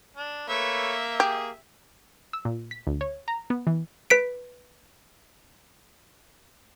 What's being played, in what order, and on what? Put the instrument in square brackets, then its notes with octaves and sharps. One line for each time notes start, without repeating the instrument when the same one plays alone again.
[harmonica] D4
[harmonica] A3 B4 C#5 [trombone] A#3 [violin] E5
[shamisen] G4 [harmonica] G#4
[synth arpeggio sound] E6
A#2
B6
D2
C#5
A#5
B3
E3
[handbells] B4 B6 D7